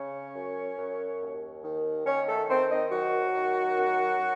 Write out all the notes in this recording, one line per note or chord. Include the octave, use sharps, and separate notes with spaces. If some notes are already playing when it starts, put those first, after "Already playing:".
Already playing: C#3 C#4 C#5
F#2
F#2
D#2
D#3
D#3 C#4 C#5
A3 A4
D#3 C4 C5
D#4 D#5
F#2 F#3 F#4
D#3
F#2